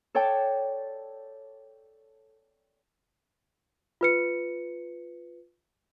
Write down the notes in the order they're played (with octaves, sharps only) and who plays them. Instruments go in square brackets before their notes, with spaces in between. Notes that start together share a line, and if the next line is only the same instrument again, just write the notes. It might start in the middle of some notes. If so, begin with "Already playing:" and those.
[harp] A4 C#5 D5 G5 A5
[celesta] F4 B4 C#7